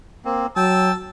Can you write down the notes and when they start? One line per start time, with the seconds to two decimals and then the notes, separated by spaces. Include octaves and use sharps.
0.25 A#3 C4
0.56 F#3 G5 A5 E6